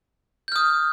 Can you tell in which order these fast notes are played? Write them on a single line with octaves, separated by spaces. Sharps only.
G6 F6 D#6